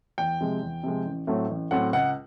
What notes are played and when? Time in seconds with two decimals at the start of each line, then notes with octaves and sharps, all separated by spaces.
0.18 E2 G5
0.41 C3 F3 G#3
0.62 E2
0.83 C3 F3 G#3
1.05 A1
1.27 A2 F#3 A3 C4
1.49 A1
1.71 A2 F#3 A3 C4 F#5
1.93 C#2 F#5